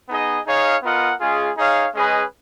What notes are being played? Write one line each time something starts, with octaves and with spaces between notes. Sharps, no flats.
B3 D#4 G#4 D#5
D#4 G#4 C#5 F5
B3 F4 A#4 D#5 F#5
G#3 C#4 F4 G#4
D#4 G#4 C#5 F5
G#3 C#4 G#4 B4 D#5